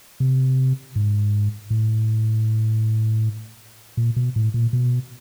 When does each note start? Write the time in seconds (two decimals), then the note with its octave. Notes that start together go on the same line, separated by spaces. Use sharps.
0.20 C3
0.96 G#2
1.70 A2
3.97 A#2
4.16 B2
4.36 A2
4.54 A#2
4.73 B2